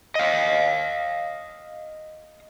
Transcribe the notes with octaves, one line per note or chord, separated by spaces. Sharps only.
D#5 F5